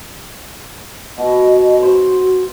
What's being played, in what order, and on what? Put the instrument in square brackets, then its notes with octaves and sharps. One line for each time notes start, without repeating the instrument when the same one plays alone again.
[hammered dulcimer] B2 [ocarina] D#5
[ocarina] F#4 [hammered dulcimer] C5